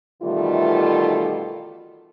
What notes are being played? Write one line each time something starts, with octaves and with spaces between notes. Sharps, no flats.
B2 D#3 E3 G3 A3 F4